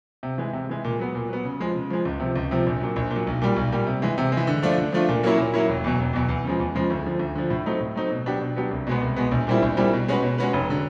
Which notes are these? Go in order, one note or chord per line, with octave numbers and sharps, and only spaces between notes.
C3
E3 G#3
C3
E3 G#3
A#2
F#3 B3
A#2
F#3 B3
C#3
F3 G#3
C#3
F3 G#3
C#2
C3 F3
C#2
C3 F3
A#1
A#2 F#3
A#1
A#2 F#3
B1
A#2 G3
B1
A#2 G3
C3
E3 G#3
C3
G#3
E3
D3
F3 A3 D4 F4
D3
F3 A3 D4 F4
A#2
F#3 A#3 C#4 E4
A#2
F#3 A#3 C#4 E4
E1
E2 B2 F#3
E1
E2 B2 F#3
E2
C#3 F3 G#3
E2
C#3 F3 G#3
D2
D3 F3
D2
D3 F3
A2
F#3 A3 C4 D#4
A2
F#3 A3 C4 D#4
B2
F#3 B3 D4 G4
B2
F#3 B3 D4 G4
C2
B2 G#3 B3
C2
B2 G#3 B3
A#1
A#2 G3 C4 E4
A#1
A#2 G3 C4 E4
B2
G#3 C#4 F#4 B4
B2
G#3 C#4 F#4 B4
F1
D3